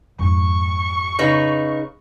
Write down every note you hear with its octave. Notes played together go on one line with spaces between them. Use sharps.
F2 G#2 C#6
C#3 D#4 B4